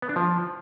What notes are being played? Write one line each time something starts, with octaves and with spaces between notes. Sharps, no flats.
B3
D4
F3